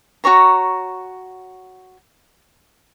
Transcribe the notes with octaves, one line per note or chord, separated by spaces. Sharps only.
F#4 G4 C#5 A#5